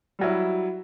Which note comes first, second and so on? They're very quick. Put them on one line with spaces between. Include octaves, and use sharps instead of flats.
G3 F#3 E4